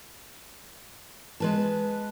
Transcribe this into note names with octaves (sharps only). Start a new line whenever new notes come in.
G#3 B4 A5